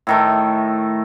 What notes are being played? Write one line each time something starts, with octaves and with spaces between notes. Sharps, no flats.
A2 D#3 A3